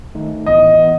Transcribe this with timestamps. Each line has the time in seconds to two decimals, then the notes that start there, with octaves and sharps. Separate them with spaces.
0.15 D#3 A3 D#4
0.46 A2 E3 B3 E4 D#5
0.78 E3 B3 E4